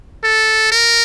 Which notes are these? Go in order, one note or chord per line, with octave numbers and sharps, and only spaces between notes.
A4
A#4